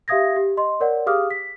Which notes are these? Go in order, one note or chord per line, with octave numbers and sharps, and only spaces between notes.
G4 E5 F5 D#6 G#6 A#6
G4
D#5 C6
A#4 C#5 D5 F#5
G4 G#4 F5 D6 D#6 F6
B6